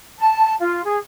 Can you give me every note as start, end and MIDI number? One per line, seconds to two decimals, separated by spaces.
0.19 0.54 81
0.60 0.81 65
0.84 0.98 68